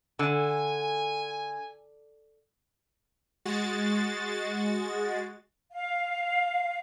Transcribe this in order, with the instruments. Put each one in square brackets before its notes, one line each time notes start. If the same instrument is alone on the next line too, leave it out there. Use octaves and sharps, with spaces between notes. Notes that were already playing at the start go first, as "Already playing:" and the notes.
[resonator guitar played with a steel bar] D3 [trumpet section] G#5
[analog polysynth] G#3 F#4 A6
[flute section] F5